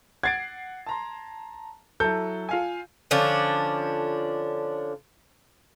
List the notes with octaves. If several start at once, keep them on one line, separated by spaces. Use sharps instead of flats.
F#5 G#6 A6 C7 D7
A5 A#5 C6
F#3 E4 A4 G6
F4 F5 G#5
D3 F3 C#4 D4